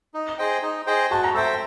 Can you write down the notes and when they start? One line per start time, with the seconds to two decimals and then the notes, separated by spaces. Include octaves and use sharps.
0.14 D#4
0.38 G#4 C5 D#5 G5
0.62 D#4
0.86 G#4 C5 D#5 G5
1.11 F#4 A5
1.24 A#5
1.34 A4 C5 E5 G5 A5